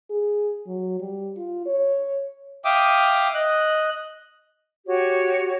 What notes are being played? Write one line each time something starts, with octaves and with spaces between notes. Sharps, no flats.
G#4
F#3
G3
F4
C#5
E5 F5 G5 D6 D#6
D#5 F#6
F#4 G4 C#5